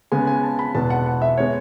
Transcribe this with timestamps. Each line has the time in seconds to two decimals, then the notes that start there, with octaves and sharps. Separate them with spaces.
0.12 C#3 G#3 B3 G#5
0.27 G#5
0.43 A5
0.59 B5
0.75 E2 B2 G#3 B3 A5
0.90 F#5
1.06 F#5
1.22 E5
1.38 G#3 B3 C#5